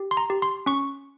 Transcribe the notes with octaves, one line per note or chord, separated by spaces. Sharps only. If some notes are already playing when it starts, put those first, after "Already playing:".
Already playing: G4
C6
A#5
G4
C6
C#4 C#6